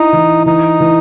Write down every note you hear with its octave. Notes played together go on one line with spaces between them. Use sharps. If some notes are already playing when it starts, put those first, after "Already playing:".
Already playing: D#4 E4
E3
E3 D#4
E3